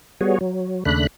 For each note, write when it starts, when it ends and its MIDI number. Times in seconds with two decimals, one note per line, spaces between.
0.21 0.38 55
0.21 0.38 59
0.21 0.38 66
0.21 0.38 68
0.21 0.38 73
0.41 0.84 54
0.85 1.07 39
0.85 1.07 49
0.85 1.07 57
0.85 1.07 62
0.85 1.07 83
0.85 1.07 90